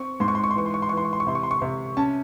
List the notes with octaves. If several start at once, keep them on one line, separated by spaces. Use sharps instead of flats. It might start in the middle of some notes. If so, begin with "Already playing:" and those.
Already playing: C4 C#6
G#2 C6
C#6
C6
C#6
C6
E3 C#6
C6
C#6
C6
E3 C#6
C6
C#6
C6
C#6
C3 C6
C#6
C6
C#6
C3 C6
C#4 A5